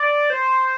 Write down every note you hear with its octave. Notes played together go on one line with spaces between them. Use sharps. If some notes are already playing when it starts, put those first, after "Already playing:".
Already playing: D5
C5